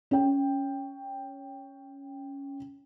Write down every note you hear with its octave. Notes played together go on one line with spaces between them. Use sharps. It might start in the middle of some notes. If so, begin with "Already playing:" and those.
C#4 G5